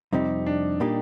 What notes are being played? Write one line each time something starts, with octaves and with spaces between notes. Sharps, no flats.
F2 C3 G3 C4 D#4 G4
D4
A#2 G3 A#3 D#4 G4